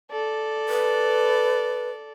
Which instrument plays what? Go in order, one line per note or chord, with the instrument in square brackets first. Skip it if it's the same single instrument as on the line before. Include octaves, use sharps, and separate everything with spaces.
[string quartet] A4 D5
[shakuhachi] B4